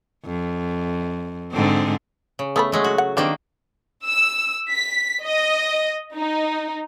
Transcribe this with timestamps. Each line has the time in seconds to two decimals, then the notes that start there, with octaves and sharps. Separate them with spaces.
0.25 F2
1.52 G#2 D3 C4
2.39 C#3
2.56 A3 B3 A4 B5
2.72 F#3 G#3 A3
2.84 F#4
2.98 F#5
3.17 D#3 G3 A#3 C4 D4 F#5
4.06 E6
4.70 B6
5.24 D#5
6.14 D#4